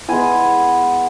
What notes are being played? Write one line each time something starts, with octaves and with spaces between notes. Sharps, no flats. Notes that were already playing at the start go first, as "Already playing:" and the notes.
G#3 B3 E4 G#5